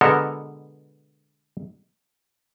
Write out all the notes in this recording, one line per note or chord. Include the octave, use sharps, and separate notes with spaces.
B2 D3 G#3 B3 A4 A#4